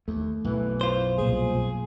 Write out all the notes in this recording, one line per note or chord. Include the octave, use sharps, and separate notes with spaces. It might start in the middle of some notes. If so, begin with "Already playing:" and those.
D#2 A3
B1 F#2 E3
F4 C5
C2 A#2 G#4